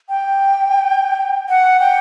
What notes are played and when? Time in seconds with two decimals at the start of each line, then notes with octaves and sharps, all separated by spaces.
0.09 G5
1.49 F#5
1.80 G5